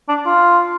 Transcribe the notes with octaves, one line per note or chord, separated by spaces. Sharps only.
D4
F4